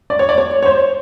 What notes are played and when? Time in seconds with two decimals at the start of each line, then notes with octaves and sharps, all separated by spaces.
0.10 D5
0.19 C#5
0.29 D5
0.38 C#5
0.62 C#5
0.66 C5